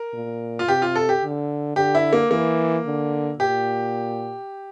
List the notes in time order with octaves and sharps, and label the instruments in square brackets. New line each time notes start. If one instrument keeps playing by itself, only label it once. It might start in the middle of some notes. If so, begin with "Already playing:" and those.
Already playing: [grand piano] A#4
[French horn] A#2
[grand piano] F4
[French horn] C3 [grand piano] G4
[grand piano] F4
A4
G4
[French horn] D3
[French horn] D3 [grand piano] G4
[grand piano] E4
A#3
[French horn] E3 [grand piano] A#3
[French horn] D3
[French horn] A#2 [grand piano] G4